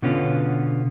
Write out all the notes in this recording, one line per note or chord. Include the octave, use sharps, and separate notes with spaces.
B2 D3 B3 C#4 F4